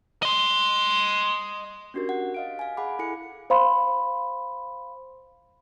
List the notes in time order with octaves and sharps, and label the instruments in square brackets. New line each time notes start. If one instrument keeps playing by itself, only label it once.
[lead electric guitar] D#5 C6
[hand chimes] C#4 D4 F#4 G4 A#4
F#5
D#5 F5 D7
F5 G#5
G#4 F#5 B5 D6
E4 A4 G#5 C#7
[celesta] C5 F5 B5 C6